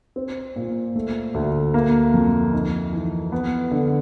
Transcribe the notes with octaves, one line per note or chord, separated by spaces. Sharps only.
C4
A#2
A3
D2
A#3
F2
D#4
E3
B3
D3